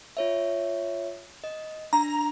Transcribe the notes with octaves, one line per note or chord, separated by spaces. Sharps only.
F4 C#5 E5
D#5
D4 A#5